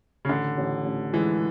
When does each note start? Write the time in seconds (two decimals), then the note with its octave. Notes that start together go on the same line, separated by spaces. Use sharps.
0.25 C#3
0.29 A1 D3
0.57 A1
0.85 A1
1.13 E3 G#3